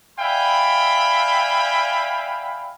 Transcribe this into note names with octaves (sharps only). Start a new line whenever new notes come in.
D5 E5 F5 G5 G#5 B5